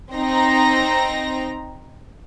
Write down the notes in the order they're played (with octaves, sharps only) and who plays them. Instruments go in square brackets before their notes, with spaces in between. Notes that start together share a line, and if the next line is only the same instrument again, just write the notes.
[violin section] C4 D#4 A#5 A#6